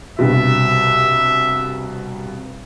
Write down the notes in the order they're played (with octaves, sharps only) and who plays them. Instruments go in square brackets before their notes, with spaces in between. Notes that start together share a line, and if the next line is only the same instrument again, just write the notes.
[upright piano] C2 G2 B2 [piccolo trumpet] E5